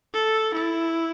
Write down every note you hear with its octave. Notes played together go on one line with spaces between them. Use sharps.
A4
E4